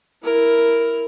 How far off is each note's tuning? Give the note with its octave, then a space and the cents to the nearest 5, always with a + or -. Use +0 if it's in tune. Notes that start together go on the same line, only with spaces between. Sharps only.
E4 +0 A#4 +0